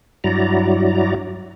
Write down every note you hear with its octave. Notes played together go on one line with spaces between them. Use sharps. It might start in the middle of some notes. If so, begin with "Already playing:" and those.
G2 F#3 E4 F#4 D5 A#5